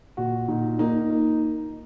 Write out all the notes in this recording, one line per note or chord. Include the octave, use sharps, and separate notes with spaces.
A#2 F#4
A#2 D#4
A#3 D#4
A#3